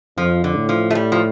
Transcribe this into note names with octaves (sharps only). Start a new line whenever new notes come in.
F2 F3
D3
A2
F3
A3
G3
F3